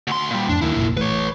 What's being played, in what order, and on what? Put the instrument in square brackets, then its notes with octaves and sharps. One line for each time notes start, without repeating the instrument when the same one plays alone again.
[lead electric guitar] D2 C6
A#2 G3
[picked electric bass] F2 A2 [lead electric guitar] D4
[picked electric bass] D#2 D#3 [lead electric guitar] A#3 E4
[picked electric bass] F1 A#1 A#2
[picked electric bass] A1 A2 [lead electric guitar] B4 C#5